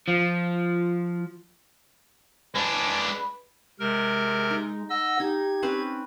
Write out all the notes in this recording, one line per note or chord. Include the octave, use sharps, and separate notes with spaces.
F3 F4
G#3 D4 B4
C3 G#3 A#4
D#4
D#5 F#5 E6
D#4 G4 G#6
C4 C#4 B4